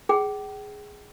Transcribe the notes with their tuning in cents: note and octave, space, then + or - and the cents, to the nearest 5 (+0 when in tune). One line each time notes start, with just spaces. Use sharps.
G#4 +0 G5 -40